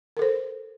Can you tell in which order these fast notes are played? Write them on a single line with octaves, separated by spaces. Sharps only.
A#4 A4 C5